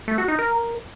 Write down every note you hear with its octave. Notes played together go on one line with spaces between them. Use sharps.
A3
F#4
D#4
A#4